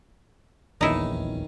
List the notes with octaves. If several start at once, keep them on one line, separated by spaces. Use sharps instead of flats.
D#1 A#1 E2 D#3 C#4 D#4 E4